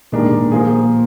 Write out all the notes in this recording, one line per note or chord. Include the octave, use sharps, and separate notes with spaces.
A#2 D#3 G#3 D4 G4 A#4
A#2
F3 A#3 F4 G#4